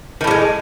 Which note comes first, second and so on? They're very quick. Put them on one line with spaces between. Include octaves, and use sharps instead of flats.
D#3 A2 G3 G#3